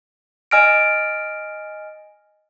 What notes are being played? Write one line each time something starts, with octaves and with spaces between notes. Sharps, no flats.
D#5 G#5 F6 A#6 D7